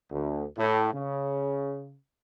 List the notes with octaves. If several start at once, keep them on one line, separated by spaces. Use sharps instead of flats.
D2
A2
C#3